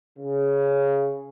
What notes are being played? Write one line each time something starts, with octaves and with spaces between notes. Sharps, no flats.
C#3